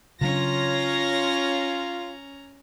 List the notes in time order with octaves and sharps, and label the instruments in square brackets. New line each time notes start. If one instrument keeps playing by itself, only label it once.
[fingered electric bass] C#3 F#3 D4 [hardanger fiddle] C#4 A#5 [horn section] F4 [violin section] C#5 A#6